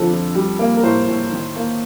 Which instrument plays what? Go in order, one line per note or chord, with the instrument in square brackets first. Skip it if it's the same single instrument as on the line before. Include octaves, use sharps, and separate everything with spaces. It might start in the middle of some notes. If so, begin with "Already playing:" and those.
Already playing: [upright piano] F2 D3 F3 A4
F2
G3
A#3
A#4
A2 C5
A2
D#3
A#3